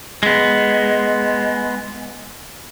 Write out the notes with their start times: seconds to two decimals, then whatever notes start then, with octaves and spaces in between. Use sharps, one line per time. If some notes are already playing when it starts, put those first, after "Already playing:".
0.23 G#3 B3